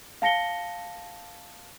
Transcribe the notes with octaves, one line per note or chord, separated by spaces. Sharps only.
F5 A5 A#6 C#7 G7